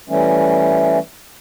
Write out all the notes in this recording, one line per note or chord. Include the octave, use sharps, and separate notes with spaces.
E3 G3 A3 C#4